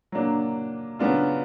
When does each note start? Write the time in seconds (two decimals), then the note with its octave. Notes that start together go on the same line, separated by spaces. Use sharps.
0.12 F#3 A#3 D4
0.99 C#3 F#3 B3 D4 F4